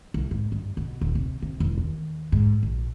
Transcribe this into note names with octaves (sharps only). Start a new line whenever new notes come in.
C2
G#2
G2
B2
D#1
C3
C3
E1
D#2
G#2
A#1